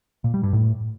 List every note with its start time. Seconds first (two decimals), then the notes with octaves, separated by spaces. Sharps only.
0.24 A#2
0.34 G3
0.43 G2
0.53 A2